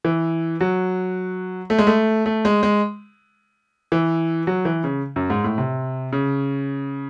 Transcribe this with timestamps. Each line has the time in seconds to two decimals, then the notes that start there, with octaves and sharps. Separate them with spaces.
0.04 E3
0.61 F#3
1.70 A3
1.79 G#3
1.87 A3
2.26 A3
2.45 G#3
2.63 G#3
3.92 E3
4.47 F#3
4.65 E3
4.84 C#3
5.16 F#2
5.30 G#2
5.44 A2
5.58 C3
6.13 C#3